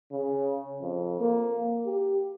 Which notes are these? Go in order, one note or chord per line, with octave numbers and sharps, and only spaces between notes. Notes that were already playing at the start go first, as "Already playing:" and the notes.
C#3
F2
A#3
G4